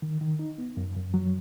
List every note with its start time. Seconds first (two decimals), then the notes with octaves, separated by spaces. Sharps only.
0.02 D#3
0.21 D#3
0.39 D#4
0.58 B3
0.77 F#2
0.96 F#2
1.14 F#3